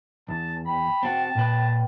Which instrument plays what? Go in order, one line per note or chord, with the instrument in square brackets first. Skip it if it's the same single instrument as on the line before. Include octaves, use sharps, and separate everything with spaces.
[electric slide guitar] E2 [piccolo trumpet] A5
[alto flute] G5 [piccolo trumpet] B5
[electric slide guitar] C4 F#4 [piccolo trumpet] A5
[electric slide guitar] A#2 B4